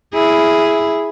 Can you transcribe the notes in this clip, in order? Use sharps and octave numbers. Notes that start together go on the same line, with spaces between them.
E4 G#4